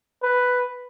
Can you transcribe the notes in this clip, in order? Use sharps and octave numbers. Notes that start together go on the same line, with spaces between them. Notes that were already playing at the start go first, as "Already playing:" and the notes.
B4